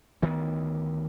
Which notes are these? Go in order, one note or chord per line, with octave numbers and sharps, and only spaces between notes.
D2 D#3 B3